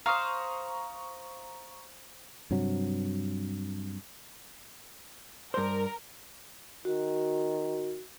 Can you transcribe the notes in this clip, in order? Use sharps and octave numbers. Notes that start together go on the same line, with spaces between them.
C5 F5 A#5 C#6 D#6
G2 C3 F#3
G2 A#4 C5
D#3 F#4